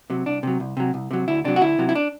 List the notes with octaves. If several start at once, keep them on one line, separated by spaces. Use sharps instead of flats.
C3 F#3
C2 D4
C3 F#3
C2
C3 F#3
C2
C3 F#3
D2 E4
C3 F#3 D4
F#4
D2 E4
C3 F#3
E4
D4